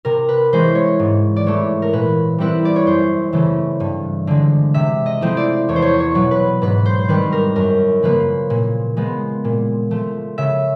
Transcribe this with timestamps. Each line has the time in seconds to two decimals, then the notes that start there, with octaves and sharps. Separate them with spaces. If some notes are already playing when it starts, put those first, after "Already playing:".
0.05 C3 A#4
0.29 B4
0.53 E3 G#3 C#4 C5
0.75 C#5
0.99 G#2
1.36 D5
1.46 E3 A3 C#5
1.82 A#4
1.93 A#2 B4
2.38 G3 C4 E4 B4
2.65 D5
2.76 C#5
2.87 F#2 C5
3.32 C#3 E3 A3 C#4
3.80 G2
4.27 D3 F3 G#3
4.74 C3 E5
5.06 D#5
5.21 F3 A3 C4 E4
5.37 D5
5.69 E2 C#5
5.76 C5
5.82 C#5
6.00 C#5
6.15 B2 F#3
6.31 B4
6.62 G#2 B4
6.85 C5
6.99 C5
7.08 D#3 G3 C4 B4
7.32 A#4
7.55 F#2 A#4
8.03 C#3 F3 A#3 B4
8.50 A#2
8.97 F3 G#3 B3
9.44 A#2
9.91 F3 A3
10.38 C#3 E5